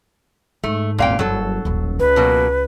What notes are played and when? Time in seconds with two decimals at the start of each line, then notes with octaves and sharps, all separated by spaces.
0.64 G#2 A3
0.98 G#1 D#2 A#2 F5 G5
1.19 F#1 G2 F#3 A4
1.65 D#1 A1
1.99 C#2 B4
2.16 B2 F#3 A#3